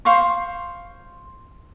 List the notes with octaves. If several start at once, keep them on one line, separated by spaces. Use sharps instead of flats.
C5 F5 C#6